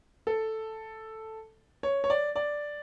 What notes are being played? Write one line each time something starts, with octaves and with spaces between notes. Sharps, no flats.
A4
C#5
C#5
D5
D5